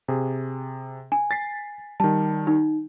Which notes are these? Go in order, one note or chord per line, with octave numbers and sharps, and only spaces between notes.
C3 G#4
G#5
A6 B6 C7
D#3 G3 A5
D#4